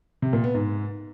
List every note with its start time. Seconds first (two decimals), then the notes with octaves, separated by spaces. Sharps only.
0.22 C3
0.33 A#2
0.44 B3
0.55 G#2